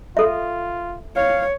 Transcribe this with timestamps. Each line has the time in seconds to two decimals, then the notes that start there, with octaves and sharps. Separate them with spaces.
0.17 F4 A4 E5
1.16 C#5 F5